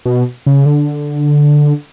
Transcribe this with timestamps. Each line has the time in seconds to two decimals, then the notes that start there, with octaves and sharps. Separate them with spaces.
0.05 B2
0.47 C#3
0.66 D3